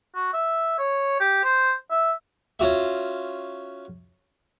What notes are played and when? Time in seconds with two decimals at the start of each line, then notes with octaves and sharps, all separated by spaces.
0.16 F#4
0.34 E5
0.79 C#5
1.21 G4
1.44 C5
1.91 E5
2.59 C#4 F4 F#4 E5